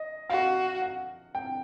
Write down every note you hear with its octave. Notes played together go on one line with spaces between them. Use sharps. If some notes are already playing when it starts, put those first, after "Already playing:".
Already playing: D#5
F#4 F5
F#5
G5